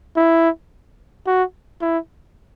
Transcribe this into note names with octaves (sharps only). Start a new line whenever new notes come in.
E4
F#4
E4